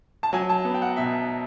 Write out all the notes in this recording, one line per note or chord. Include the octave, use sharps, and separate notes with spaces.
A5
F#3 G#5
A5
B3
G5
F#5
B2 E5